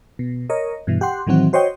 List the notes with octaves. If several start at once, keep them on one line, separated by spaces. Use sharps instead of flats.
B2
A#4 C#5 D#5
G2 B2 E3
G4 F#5 C6
A2 D#3 E3 F#3 C4 F#4
F#4 C5 C#5 D#5 G5